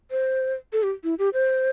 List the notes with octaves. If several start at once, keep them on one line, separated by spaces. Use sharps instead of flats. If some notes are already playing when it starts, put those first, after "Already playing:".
C5
A4
G4
E4
G4
C5